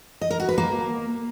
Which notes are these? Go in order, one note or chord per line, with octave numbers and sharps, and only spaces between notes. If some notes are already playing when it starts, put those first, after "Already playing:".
D#5
A#4
F#4
B4
A#3